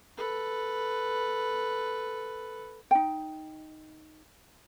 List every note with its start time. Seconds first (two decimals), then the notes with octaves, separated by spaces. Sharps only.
0.17 A4 B4
2.91 D#4 G5